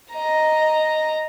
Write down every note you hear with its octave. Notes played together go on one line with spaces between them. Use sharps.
D#5 A#5